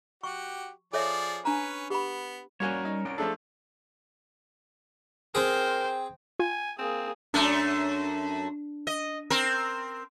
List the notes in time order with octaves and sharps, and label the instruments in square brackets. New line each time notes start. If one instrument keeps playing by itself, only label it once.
[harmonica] F#4 G4 [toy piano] C#6
[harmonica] F3 G#4 D5 [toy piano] A4 C#5 E5
[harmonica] C#4 B4 [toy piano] D4 A#5
[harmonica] B3 [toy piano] G4 B5
[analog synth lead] G3 [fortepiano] A#3 F#4 G#5 [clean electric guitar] C#4 A#4 C#5
[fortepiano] D#4
[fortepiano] C2 [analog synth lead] D7
[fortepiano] F3 A3 D4 [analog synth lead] G#4 [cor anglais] A4
[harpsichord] C4 G#4 [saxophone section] A#4 [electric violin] C5 [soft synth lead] G5
[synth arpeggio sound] F4 [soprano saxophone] G#5
[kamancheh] A#3 G#4 [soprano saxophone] C4
[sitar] F#2 A3 [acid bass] D4
[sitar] D#5
C4 A#4